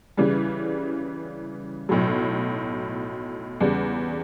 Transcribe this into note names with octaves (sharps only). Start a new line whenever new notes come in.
C#3 E3 G3
B1 A2 F#3
E2 C#3 G3